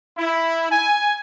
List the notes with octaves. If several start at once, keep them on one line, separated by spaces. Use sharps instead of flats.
E4
G#5